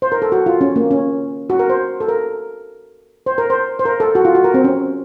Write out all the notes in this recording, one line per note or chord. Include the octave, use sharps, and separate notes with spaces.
C5
A#4
A4
F#4
F4
C#4
A#3
C#4
F#4
A#4
C5
A4
A#4
C5
A#4
C5
C5
A#4
A4
F#4
F4
F#4
A#4
C4
C#4